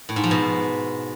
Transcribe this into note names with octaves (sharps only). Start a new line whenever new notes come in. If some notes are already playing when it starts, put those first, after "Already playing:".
A2
G#2
F3
B2